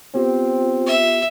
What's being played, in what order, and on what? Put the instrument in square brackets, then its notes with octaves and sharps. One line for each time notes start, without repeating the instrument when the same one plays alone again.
[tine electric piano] B3 G4 [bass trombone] C4 [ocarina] F4
[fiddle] E5